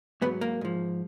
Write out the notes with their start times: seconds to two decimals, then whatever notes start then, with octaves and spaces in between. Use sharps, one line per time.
0.22 G#2 F#3 B3
0.41 A#3
0.61 G#2 F3